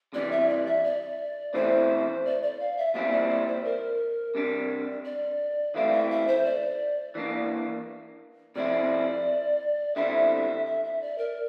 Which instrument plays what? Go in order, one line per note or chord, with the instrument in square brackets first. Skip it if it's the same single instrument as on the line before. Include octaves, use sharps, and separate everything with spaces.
[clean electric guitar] C3 E3 G3 [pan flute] D5
[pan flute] E5
D5
E5
D5
[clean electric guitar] C3 E3 A3 C4 E4 [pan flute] C5
[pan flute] D5
D5
F5
E5
[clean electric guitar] A#2 G3 C4 E4 [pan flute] E5
[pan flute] D5
D5
C5
A#4
[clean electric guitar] C3 G3 D4
[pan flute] D5
[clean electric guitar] E3 A3 C4 E4 [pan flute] F5
[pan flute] E5
E5
C5
D5
[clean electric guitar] E3 A#3 D4
[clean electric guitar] C3 F3 C4 E4 [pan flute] D5
[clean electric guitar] D3 G3 C4 E4 [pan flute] E5
[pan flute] E5
E5
D5
A#4